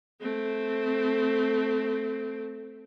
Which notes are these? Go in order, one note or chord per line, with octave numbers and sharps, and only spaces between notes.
A3 C4